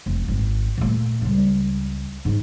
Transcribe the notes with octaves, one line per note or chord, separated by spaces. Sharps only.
F1
G#1
A#2 A3
C#2 G3
G#2